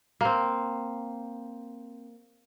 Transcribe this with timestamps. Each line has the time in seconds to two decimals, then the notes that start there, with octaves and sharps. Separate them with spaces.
0.21 A#3 C4